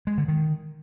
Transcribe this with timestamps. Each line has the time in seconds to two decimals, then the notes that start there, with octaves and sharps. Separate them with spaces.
0.07 G#3
0.18 D3
0.28 D#3